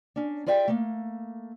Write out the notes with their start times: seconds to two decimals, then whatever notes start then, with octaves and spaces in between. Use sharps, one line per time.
0.16 C#4 D4
0.46 F4 G#4 D5 E5 G5
0.68 A3 A#3